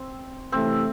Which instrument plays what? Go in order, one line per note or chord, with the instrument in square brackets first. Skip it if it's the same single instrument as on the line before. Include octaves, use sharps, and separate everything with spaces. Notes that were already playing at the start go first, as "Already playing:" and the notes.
Already playing: [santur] C4
[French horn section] C3 E3 A3 [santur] C4